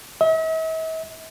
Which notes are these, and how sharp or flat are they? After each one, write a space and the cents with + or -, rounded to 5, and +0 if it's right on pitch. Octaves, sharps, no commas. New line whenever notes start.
E5 -45